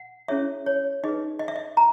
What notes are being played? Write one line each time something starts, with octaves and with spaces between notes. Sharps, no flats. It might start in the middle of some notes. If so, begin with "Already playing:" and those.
Already playing: F#5
C#4 E4 G#4 C#5 E5
C#5
D#4 G#4 B4 D#5
D#5
E5
D#5
A#5